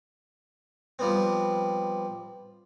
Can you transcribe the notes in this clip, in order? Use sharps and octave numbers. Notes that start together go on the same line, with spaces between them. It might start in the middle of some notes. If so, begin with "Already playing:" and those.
F3 G3 B3 C4